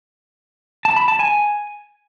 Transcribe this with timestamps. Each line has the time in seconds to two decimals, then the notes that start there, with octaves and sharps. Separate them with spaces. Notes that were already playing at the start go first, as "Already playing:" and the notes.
0.85 A5
0.97 B5
1.08 A5
1.19 G#5